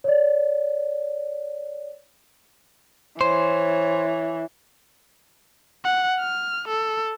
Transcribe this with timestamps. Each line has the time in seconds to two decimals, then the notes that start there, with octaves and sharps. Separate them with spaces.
0.04 C#5 D5
3.21 E3 C5 C#5
5.84 F#5
6.20 F6
6.68 A4